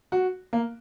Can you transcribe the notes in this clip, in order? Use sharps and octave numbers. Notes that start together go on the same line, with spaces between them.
F#4
A#3